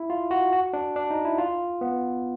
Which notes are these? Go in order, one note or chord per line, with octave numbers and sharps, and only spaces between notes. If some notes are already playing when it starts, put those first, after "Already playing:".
Already playing: E4
F4
F#4
F#4
D4
D4
D#4
E4
F4
B3